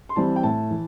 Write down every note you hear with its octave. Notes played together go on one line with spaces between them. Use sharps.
C6
E3 G3 C4 A5
G5
A2 A5
E3